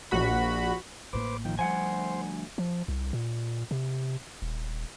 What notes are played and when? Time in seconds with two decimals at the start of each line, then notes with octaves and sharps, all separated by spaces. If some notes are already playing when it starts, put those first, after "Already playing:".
0.11 A#1 F#4 B5
1.13 A1 A2 A#3 B4 C5 D6
1.45 D#3 F3 G5
1.59 D2 F3 G3 C5 F#5 G#5
2.58 F3
2.88 C2
3.13 A#2
3.71 C3
4.42 D#1